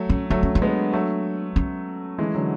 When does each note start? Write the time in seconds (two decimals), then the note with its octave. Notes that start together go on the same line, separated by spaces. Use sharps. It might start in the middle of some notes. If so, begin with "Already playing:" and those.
Already playing: F#3 A3
0.10 C#4
0.30 F#3 A3 D4
0.43 C#4
0.55 D4
0.62 G#3 B3
0.93 F#3 A3
1.56 C#4
2.18 E3 G#3
2.35 D3 F#3